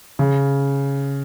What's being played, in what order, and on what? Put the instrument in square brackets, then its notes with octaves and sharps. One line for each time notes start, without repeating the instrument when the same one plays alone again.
[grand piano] C#3